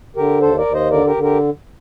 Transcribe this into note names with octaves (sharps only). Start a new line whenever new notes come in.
D3 G4 A#4
D#2 A4 C5
A#4 D5
D#2
C5 D#5
D3 A#4 D5
G4 A#4
D3
G4 A#4